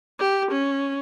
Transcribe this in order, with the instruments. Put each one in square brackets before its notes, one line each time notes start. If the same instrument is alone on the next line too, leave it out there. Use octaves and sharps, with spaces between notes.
[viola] G4
C#4